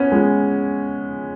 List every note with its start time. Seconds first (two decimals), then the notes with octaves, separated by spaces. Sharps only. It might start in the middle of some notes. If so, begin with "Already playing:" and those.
Already playing: B3 C#4
0.12 G#3